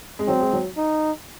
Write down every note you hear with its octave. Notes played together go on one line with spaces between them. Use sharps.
G#3
F#3 C4
G#3
F#3
D#4